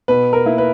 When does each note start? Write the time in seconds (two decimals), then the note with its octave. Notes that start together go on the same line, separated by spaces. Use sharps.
0.08 B2 B4
0.33 A#4
0.46 A#3 E4
0.58 B4